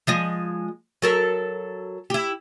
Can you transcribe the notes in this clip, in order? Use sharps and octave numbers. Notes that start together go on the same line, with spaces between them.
F3 G#3 D#5
F#3 A4 A#4
E4 G4